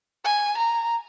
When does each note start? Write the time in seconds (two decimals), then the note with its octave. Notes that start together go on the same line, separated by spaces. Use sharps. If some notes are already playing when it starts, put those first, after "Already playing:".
0.24 G#5
0.57 A#5